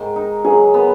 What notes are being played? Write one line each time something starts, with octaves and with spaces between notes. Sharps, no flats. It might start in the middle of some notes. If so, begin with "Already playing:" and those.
Already playing: G#2 D#3
D#4
F#3 G#4
B3